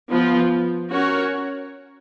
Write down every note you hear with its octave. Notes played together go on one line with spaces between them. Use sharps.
F3 B3 F4
C#4 F#4 A#4 C#5